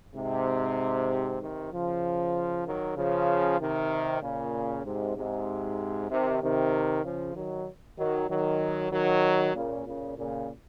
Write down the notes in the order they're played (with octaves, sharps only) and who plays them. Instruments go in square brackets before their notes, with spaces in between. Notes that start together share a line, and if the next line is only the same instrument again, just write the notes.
[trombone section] G#2 C3
C3 D#3
C#3 F3
D#3 F#3
C#3 F3
C3 D#3
A#2 C#3
G#2 C3
G#2 C3
C3 D#3
C3 D#3
C#3 F3
D#3 F#3
D#3 F#3
D#3 F#3
D#3 F#3
A#2 C#3
A#2 C#3
A#2 C#3